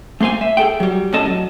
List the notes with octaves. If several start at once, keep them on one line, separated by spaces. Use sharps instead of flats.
A3 A#3 C5 F5 G#5
E5
G#4 A4 G5
F#3 G3
A2 G3 C#4 A4 D#5 A5
F#3